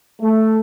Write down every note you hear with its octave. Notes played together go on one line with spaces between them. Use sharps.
A3